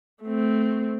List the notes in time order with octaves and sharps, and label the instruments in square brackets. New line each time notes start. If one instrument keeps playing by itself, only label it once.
[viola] A3 C4